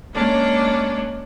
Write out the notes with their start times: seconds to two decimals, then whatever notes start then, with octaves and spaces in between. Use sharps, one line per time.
0.15 G#3 A#3 C#4 D4